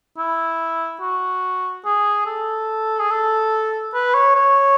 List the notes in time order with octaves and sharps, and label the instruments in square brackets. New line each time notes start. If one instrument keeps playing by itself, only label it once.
[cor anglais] E4
F#4
G#4
A4
G#4
A4
B4
C#5
C#5